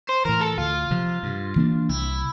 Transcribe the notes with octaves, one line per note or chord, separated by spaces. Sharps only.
C5
A2 E3 A#4
A4
D2 F4
C3 F3
G2
E3 A#3 D4
C2 E4